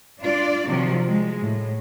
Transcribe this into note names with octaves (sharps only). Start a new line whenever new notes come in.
D4 F4 D5
C3 D#3 F3 F#3
G#3
A2